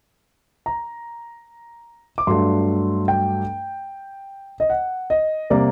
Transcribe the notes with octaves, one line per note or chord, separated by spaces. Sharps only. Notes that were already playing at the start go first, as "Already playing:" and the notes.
A#5
D6
G2 F#3 A3 D4 C6
G5
D#5
F#5
D#5
C3 G3 A#3 D5